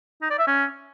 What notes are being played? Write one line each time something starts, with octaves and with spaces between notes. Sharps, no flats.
D#4
D5
E5
C#4